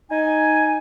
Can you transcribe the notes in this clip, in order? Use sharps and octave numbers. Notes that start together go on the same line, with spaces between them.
D#4 G#5